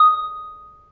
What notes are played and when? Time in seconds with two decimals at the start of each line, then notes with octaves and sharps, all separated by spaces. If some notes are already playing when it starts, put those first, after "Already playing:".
Already playing: D#6